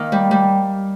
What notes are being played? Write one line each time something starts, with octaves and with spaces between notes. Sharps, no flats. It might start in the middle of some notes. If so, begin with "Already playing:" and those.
Already playing: D#3 A#3
G3
G3